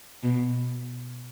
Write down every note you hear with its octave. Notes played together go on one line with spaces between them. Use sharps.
B2